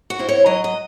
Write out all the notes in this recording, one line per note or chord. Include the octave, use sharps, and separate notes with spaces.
F#4
C4 E4
C#5
F#3 D#5
D#5